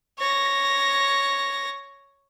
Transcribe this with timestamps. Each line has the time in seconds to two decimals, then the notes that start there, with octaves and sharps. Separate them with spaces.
0.19 C#5 A#6